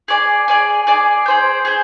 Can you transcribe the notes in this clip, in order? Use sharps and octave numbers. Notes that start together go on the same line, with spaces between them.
G#4 D5 G#5
G#4 D5 G#5
G#4 D5 G#5
G#4 C5 G5
G#4 C5